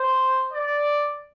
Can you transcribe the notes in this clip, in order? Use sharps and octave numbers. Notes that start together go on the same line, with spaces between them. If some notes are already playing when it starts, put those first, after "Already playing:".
Already playing: C5
D5